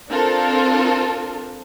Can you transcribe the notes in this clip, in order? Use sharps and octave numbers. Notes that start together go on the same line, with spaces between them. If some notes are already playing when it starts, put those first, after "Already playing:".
C4 D4 F4 A4 A#4